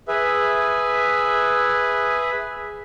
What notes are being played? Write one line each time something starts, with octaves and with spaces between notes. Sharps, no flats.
G#4 B4 E5